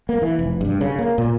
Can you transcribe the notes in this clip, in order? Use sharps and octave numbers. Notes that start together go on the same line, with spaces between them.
A#3
E3
F1
G2
C#3
A#3
A#2